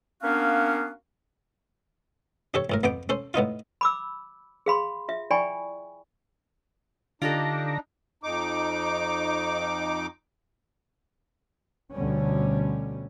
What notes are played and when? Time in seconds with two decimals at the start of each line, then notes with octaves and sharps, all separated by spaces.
0.22 A#3 B3 C#4 D4 F#4 F5
2.54 D4 G4 A4 C#5
2.70 A#1 A2 A#4
2.83 A#1 F2 B3 G5 D6
3.09 C#4 A4 C5
3.34 A2 B3 D#4 F4
3.81 B5 D6 E6
4.66 G#4 F5 B5 C6
5.09 F4 E5
5.30 E4 D5 G5 G#5 B5 C#6
7.22 D3 D4 D#4 F4 G4 A4 D6 A#6
8.23 F2 D#4 D6
11.91 D2 B2 D3 G3 C#4